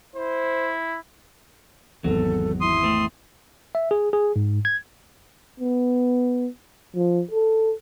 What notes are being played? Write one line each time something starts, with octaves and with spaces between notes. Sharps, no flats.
E4 C5
G#1 E2 F#3 A4
E4 C6 D#6
A3 C4
E5
G#4
G#4
G#2
G#6
B3
F3
A4